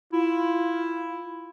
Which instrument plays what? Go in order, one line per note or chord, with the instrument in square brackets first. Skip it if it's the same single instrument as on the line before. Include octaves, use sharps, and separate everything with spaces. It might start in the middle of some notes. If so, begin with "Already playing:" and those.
[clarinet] E4 [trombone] F4